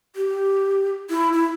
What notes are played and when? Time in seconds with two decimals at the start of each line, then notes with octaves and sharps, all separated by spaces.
0.16 G4
1.10 E4
1.33 E4